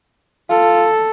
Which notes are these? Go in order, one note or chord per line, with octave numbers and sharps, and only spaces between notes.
F4 A4